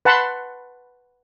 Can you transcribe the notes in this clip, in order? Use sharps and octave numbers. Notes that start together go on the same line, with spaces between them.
B4 F#5 A5 B5 C6